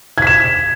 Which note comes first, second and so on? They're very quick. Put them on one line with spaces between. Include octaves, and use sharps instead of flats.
G#6 B6 E7